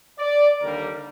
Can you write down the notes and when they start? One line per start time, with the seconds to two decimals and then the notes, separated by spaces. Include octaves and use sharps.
0.19 D5
0.61 D#2 D3 G3 A#3 A#4